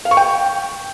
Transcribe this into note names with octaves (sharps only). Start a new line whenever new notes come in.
F5
C#6
G5